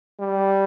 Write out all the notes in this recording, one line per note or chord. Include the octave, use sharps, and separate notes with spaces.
G3